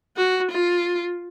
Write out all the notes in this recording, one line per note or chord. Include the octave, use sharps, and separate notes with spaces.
F#4
F4